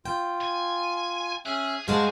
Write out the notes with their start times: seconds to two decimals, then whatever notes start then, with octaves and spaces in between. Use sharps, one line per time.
0.05 F4 G5
0.42 G#5
1.46 C#4 G#4 E5 F#6
1.88 G2 G#3 F#4 G#4 C5 F5 A5